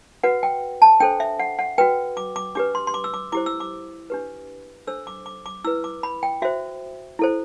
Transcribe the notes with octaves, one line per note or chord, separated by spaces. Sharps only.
F#4 B4 F#5
G5
A5
D4 A4 C5 G5
E5
F#5
F#5
F#4 B4 G5
D6
D6
D4 G4 B4 D6
C6
C6
D6
E6
D6
E4 G4 C5 D6
E6
D6
D4 G4 B4
D4 A4 C5 E6
D6
D6
D6
E4 B4 E6
D6
B5
G5
F#4 C5 E5
E4 A4 C5